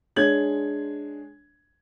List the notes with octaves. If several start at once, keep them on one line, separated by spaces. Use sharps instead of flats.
G#3 D4 C#5 G#6 F#7